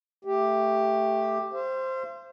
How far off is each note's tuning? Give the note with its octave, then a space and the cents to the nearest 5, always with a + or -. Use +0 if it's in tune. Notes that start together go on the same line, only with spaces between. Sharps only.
A3 +0 G4 +5
C5 +0 F5 -45